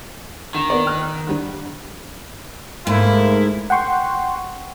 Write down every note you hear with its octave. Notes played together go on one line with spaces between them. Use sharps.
D3 D#3
A#3 B3 D5
G5 F6 F#6
D3 G3 D4
G#2 A3 A#3 E4
F#5 G5 C6 C#6